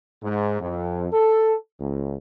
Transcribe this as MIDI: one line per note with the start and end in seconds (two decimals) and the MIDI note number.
0.23 0.59 44
0.61 1.07 41
1.12 1.55 69
1.80 2.16 37